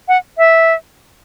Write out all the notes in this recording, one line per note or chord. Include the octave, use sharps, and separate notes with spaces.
F#5
E5